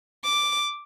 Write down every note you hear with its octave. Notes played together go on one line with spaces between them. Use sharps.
D6